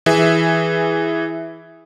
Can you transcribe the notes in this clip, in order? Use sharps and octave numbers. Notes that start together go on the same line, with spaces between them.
E3 G#4 E5